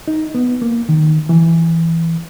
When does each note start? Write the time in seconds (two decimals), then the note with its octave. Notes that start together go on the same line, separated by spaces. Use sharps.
0.08 D#4
0.35 B3
0.62 A#3
0.89 D#3
1.29 E3